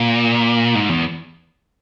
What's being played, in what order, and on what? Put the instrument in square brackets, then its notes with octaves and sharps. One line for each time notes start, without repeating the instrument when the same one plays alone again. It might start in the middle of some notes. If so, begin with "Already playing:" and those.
Already playing: [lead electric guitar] A#2
G#2
E2